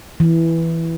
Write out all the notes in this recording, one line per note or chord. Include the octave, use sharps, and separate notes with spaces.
E3